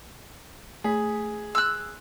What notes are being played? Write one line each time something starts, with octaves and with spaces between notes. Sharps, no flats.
A3 G#4 B6
C6 E6 F#6